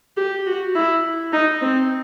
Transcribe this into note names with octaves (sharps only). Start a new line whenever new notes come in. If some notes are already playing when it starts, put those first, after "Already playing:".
G4
F#4
E4
D#4
C4